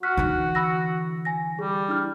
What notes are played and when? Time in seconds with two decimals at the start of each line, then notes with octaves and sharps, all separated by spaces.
0.03 F#4 F6 F#6 B6
0.17 D3 E3 D#4
0.55 B5 E6 A#6
1.25 G#5 A#6
1.59 G3 G#4
1.88 D4 E4 F6